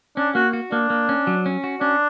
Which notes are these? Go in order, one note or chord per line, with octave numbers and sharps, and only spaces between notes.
C#4 D4
A#3 F#4
F#4
A#3 D4
A#3
C#4
F#3
C#4
F#4
C#4 D4